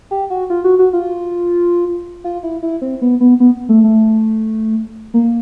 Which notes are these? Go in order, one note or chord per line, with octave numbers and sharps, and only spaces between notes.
G4
F#4
F4
F#4
F#4
F4
F4
E4
E4
C4
B3
B3
B3
A3
A3
A#3